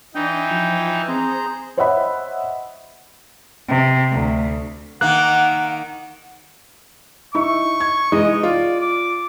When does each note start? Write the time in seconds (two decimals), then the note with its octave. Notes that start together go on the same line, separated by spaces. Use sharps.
0.15 E3 D4 D#4 G5
0.51 F3
1.08 C4 G#4 C5 A#5
1.77 C5 C#5 D#5 E5 F#5 B5
3.69 C3
4.12 D2
5.01 D#3 A#3 F#5 F#6
7.35 D#4 E4 C#6
7.81 G#6
8.12 E3 G#3 D#4 D#5
8.43 F4 D5
8.80 D6